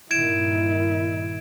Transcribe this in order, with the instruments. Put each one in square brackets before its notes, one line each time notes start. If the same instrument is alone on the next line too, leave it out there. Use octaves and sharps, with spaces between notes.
[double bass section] G2 A#2 D#3 [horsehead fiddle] E4 [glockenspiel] G#6 D7 E7